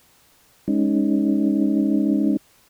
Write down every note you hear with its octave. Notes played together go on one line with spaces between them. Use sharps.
G#3 C#4 D#4